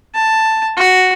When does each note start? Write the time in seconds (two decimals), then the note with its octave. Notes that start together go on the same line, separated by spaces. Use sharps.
0.14 A5
0.77 F#4